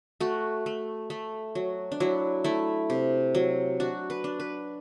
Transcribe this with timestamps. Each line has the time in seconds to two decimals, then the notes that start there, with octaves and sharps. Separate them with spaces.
0.20 A3 F#4
0.66 A3
1.10 A3
1.55 F#3
1.92 D4
2.00 F#3 E4
2.44 A3 E4
2.90 C3
3.35 F#3
3.80 D4 F#4
4.10 B4
4.24 D4
4.40 B4